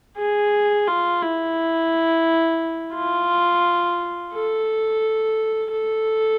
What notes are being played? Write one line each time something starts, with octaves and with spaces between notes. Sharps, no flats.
G#4
F4
E4
F4
A4
A4